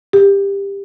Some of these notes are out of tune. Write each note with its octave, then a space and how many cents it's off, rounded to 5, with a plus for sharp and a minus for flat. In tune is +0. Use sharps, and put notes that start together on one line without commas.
G4 +20